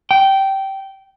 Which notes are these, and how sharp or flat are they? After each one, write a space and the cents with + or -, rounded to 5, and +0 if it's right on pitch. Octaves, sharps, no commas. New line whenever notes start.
G5 -15